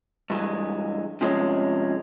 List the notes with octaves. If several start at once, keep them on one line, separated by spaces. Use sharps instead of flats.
G2 E3 G#3
C3 F3 G#3 C#4